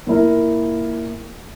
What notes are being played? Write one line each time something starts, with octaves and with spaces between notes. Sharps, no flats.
A#2 A#3 E4 A#4